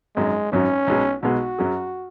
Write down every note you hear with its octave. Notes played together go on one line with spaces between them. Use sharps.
G#1 F#2 F#3 G#3
G#1 F#2 F#3 C#4
B1 B2 G#3 B3
B1 B2 G#3 B3 F#4
F#2 F#3 C#4 G#4